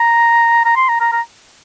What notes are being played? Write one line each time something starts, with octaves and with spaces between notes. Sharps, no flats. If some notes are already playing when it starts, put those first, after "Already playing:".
Already playing: A#5
A#5
C6
A#5
A#5
A#5